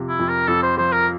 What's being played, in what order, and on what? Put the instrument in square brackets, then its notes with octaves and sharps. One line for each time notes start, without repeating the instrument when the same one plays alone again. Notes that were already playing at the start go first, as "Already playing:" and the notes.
Already playing: [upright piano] F2 C3 F3
[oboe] E4
[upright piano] F2
[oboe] A#4
[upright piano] F2 [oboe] A4
[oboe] C5
[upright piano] F3 [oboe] C5
[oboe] A#4